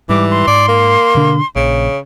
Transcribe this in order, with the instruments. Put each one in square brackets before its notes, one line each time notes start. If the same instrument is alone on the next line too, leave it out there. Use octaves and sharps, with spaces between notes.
[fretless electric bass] G#2 G3 [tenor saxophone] E3 [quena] D6
[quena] C6
[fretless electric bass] G#2 [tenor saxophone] D5
[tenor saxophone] A#3
[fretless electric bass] B2 D3 D4
[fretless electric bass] A#1 [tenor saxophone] C#3